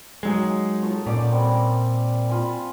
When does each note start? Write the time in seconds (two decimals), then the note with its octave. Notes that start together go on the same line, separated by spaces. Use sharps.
0.23 F#3 G#3 A#3 D#4 G#4
0.83 F4 A4 C#5
1.06 A#2 C#4 D5 F#5
1.31 G3 C4 A#4
2.28 F4 G#5 B5